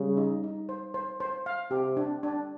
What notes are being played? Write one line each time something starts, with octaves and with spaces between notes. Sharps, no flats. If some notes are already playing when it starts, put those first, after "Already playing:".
Already playing: C#3 G3
D#4
D#4
C5
C5
C5
F5
C3 G4
D4
D4